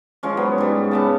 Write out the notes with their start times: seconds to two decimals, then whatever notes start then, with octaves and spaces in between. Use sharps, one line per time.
0.23 F3 G#3 C#4
0.37 F#3 B3
0.58 G#2 G3
0.91 C#3 B3 A5